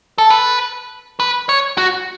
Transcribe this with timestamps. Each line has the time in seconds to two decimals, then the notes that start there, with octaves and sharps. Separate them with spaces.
0.18 A4
0.30 B4
1.20 B4
1.49 C#5
1.78 F#4